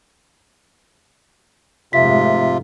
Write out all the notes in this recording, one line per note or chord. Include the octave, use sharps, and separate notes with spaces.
F1 G#2 C3 F4 E5 B6